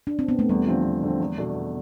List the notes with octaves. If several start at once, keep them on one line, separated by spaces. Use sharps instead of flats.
D4
C4
B3
A3
E2 G3
D3 F3 C4
E2
D3 F3 C4
E2
B2 A3 D4
E2